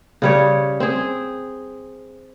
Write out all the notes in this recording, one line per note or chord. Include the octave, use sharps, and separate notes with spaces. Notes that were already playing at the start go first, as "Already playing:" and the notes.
C#3 G3 C#5
C4 G#4